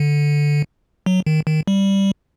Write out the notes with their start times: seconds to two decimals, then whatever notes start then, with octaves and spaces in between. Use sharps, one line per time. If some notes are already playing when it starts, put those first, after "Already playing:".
Already playing: D3
1.06 F#3
1.27 D#3
1.47 D#3
1.68 G3